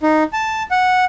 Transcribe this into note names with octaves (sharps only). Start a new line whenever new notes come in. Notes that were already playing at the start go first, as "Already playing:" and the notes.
D#4
A5
F#5